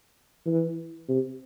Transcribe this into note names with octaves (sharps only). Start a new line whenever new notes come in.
E3
C3